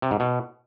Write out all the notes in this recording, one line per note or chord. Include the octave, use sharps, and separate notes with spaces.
C3
G#2
B2